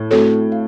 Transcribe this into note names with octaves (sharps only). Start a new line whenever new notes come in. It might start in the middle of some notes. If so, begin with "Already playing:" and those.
Already playing: A2
A3 C4 F#4 A4 C#5
F5